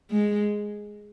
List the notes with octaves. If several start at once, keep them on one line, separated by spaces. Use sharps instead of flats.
G#3